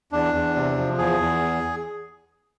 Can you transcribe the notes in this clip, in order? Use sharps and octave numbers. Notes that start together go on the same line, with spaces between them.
E2 D4
E2
C3
F3
E2 G#4
E2